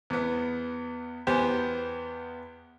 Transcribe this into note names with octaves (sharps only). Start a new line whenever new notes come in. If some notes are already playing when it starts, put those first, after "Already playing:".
E2 B3
E2 B3 G4 C5 G#5